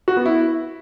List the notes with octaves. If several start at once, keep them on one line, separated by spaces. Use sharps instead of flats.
F#4
B3
E4